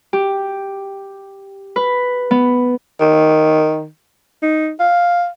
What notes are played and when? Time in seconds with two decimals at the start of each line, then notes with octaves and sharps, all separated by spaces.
0.13 G4
1.76 B4
2.31 B3
3.00 D#3
4.42 D#4
4.80 F5